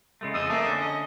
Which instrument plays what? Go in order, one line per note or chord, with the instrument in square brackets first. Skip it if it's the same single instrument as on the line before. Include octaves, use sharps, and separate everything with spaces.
[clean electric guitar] C#3 G#3 A3
[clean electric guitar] F2 D#5 [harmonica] G#4 D#6 E6
[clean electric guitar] A3 A#3 C4 [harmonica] D#5 E5 A5
[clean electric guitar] D3 C#4
[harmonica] D#5